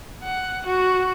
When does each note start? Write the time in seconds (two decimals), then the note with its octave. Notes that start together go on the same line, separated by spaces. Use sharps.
0.24 F#5
0.67 F#4